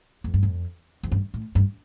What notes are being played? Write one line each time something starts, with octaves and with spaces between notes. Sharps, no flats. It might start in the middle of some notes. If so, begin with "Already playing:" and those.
F2
G2
F2
F2
G2
A2
G2